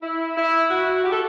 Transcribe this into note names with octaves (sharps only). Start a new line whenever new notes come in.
E4
E4
F#4
G4
A4